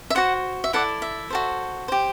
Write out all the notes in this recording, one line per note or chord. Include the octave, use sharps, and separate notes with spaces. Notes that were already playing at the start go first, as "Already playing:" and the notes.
E5
F#4 C5 F#5
E5
E4 A4 D5 F#5
E5
F#4 A4 C5
G4 C5